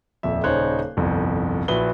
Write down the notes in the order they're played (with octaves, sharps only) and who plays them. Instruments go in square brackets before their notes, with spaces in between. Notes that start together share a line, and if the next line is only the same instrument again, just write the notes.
[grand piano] D#1 F2 E5
D#1 C#3 D#4 C5 C#5 F#6
G1 C2 F2
A#1 E4 F#4 B4 G7